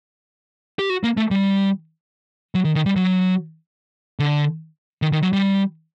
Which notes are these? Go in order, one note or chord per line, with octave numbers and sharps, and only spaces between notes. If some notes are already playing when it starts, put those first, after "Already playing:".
G4
F#4
A#3
A3
G3
F#3
D#3
D#3
G3
F#3
D3
D#3
D#3
F#3
G3